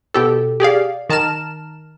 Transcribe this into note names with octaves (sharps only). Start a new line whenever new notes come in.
B2 G4 A4
G4 G#4 D5 F5
D#3 A5 A#5 F6 E7